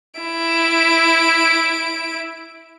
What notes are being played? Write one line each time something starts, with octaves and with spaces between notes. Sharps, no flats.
E4 D7